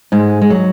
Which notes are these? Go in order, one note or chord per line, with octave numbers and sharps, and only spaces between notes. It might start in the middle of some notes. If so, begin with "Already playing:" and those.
G#2 G#3
G#3
F#3